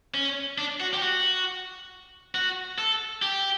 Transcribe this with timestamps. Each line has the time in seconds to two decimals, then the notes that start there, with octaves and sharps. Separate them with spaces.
0.14 C#4
0.58 D4
0.80 F#4
0.94 G4
1.02 F#4
2.35 F#4
2.78 A4
3.22 G4